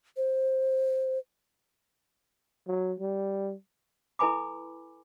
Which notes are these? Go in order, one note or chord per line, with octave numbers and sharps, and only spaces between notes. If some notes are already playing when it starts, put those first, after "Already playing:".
C5
F#3
G3
E4 A4 B4 G#5 B5 D6